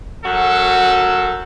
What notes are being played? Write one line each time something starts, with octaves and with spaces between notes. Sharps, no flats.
F#2 F#3 F#4 A4